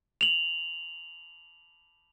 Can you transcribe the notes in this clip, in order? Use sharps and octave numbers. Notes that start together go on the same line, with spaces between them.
F7 F#7